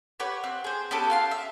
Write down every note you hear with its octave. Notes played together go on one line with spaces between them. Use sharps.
G4 B4 C#5 F#5
C4 F#6
G#4 C5
B3 C#4 G4 A4
F4 F5 C6
E5